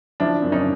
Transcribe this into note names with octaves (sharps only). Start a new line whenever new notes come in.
F3 D4 E4
F#2
C#4 D#4